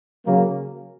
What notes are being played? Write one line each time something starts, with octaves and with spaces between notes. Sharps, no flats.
C#3 F#3 A#3